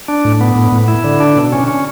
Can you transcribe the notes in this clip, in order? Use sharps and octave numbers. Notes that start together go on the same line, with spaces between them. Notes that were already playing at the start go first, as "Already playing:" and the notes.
D4
A2
B3
A2
A2
E4
D3
D4
B2
C#4
C#4